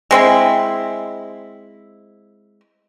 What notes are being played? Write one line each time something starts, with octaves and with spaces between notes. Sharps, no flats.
G#3 C4 E4